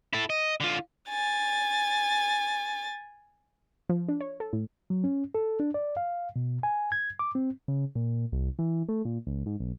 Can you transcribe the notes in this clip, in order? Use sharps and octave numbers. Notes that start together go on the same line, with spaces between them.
E4 A4
D#5
D3 F4
G#5 A6
F3
D4
C#5
A4
A2
F#3
C#4
A4
D4
D5
F5
B2
G#5
G#6
D6
C4
C#3
A#2
C2
E3
A3
A#2
C#2
G#2
B1